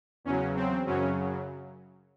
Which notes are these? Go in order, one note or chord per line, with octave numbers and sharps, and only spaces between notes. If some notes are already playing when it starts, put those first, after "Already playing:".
E2 C#3 F#3 C#4
C4
F#2 C#3 F#3 C#4